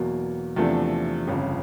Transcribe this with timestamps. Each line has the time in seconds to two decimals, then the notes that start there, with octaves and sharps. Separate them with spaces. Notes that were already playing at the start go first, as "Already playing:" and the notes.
Already playing: E2 B2 F#3 A#3
0.56 E2 C3 F3 A3 D4
1.28 G1 F2 C#3